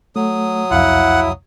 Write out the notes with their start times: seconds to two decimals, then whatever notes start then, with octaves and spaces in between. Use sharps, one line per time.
0.16 F#3 A3 D#6
0.71 C2 F2 E4 F5 F#5